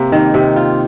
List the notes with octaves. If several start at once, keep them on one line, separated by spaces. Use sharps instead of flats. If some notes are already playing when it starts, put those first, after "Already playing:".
Already playing: C3 A#3
D#3
C3
F4